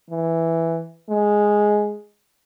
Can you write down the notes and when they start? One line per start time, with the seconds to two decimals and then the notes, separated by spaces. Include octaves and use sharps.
0.10 E3
1.10 G#3